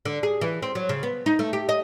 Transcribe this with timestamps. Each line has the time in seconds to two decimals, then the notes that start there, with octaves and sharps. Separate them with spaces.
0.05 D3
0.23 G#4
0.41 E3
0.63 C4
0.75 F#3
0.89 C#3
1.03 B3
1.26 D#4
1.39 A3
1.53 G4
1.69 D#5